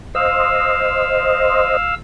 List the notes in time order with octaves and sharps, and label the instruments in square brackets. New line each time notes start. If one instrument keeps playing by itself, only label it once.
[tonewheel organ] C5 D#5 [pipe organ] F5 E6